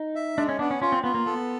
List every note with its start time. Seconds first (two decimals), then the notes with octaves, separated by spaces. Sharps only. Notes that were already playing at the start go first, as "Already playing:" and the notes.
Already playing: D#4
0.15 E5
0.37 G#3 D4
0.49 C#4
0.59 B3 D4
0.71 C#4
0.81 C#4 F4
0.92 C4
1.03 B3 F4
1.14 A#3
1.26 B3 A4